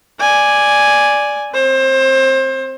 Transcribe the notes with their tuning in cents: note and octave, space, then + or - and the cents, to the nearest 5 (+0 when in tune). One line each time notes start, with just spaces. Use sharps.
D5 +0 G#5 +0
C4 -5 C5 +25